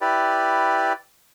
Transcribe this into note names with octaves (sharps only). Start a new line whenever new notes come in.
E4 G4 B4 D5